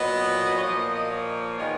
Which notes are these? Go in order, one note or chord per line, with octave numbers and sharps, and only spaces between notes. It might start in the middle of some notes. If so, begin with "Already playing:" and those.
Already playing: A#2 F#3 B3 D#5
C#5
A#2 F3 A#3 D#5
D#5
D#5
C#5
D#3 G#3 B3 F4